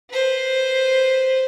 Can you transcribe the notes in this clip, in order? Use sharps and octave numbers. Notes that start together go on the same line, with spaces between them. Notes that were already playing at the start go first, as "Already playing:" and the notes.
B4 C5